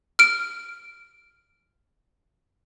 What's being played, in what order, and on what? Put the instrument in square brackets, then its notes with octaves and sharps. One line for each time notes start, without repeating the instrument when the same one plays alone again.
[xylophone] F6 D7